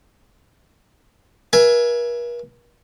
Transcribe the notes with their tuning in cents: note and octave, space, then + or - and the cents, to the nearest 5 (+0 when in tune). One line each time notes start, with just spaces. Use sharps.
A#4 +45 E5 +20 G#5 +10